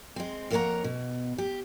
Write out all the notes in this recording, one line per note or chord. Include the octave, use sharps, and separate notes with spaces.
G#3 C4
F2 A#3 A#4 C#5 F#5 A#5
B2
G4